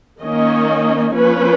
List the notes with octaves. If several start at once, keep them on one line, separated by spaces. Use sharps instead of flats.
D#3 A#3 C#4 D#5
F3 A#3 C#4 B4